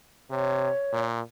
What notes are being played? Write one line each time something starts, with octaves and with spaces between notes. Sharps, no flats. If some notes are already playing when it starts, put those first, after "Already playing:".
C3 C#5
A#2